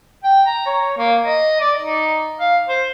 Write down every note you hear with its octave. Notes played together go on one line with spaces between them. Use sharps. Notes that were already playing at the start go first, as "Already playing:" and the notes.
G5
A#5
C#5
A#3
D#5
D5
D#4
F5
C5